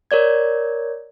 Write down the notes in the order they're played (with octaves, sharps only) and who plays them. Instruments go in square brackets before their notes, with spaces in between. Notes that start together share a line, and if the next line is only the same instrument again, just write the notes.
[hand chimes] A#4 C#5 D5 G#6